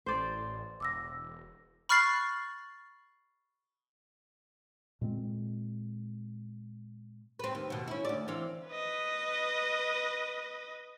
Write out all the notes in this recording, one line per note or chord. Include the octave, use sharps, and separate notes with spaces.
A1 C5 D5
E1 D6 E6 A#6
B5 C#6 F6 F#6 A6 C7
A#2 G#3 C4
C4 B4
D#2
D#2 B2
C#4 E4
D2 D5
E3 C4 F5
B4 D#5